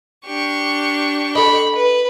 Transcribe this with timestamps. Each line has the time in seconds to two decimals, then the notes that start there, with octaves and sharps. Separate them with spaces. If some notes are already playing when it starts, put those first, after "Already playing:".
0.25 D4 G4 C#6
1.35 A4 D#5 B5
1.75 B4